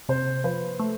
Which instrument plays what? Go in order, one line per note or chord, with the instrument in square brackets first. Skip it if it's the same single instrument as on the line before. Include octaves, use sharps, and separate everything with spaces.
[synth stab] C3 [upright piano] C5
[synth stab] F3 [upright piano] B4
[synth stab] A3